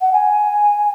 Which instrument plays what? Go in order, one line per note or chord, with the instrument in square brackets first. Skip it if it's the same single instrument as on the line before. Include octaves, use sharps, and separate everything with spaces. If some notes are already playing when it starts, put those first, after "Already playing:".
[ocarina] F#5
G#5